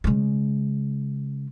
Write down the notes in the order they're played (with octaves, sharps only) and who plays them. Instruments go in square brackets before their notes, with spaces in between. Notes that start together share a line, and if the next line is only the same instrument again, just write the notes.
[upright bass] C#3 G#3